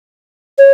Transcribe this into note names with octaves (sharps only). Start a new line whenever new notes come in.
C#5